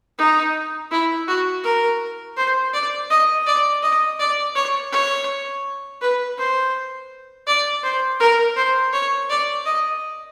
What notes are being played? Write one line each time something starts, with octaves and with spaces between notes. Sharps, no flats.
D#4
E4
F#4
A#4
C5
D5
D#5
D5
D#5
D5
C#5
C#5
B4
C5
D5
C5
A#4
C5
C#5
D5
D#5